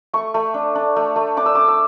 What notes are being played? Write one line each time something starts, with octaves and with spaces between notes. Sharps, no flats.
A3 C#6
A3
D4
D4
A3
A3
D4 D6
E6
D4 D6
E6